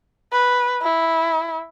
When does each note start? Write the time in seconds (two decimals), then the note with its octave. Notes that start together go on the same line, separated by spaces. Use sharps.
0.33 B4
0.83 E4